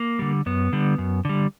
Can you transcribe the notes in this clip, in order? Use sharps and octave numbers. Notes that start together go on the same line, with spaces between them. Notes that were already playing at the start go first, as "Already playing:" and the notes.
Already playing: A#3
D3 G3
F#2 B3
D3 G3
F#2
D3 G3